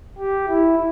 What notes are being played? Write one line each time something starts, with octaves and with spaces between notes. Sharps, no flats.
G4
E4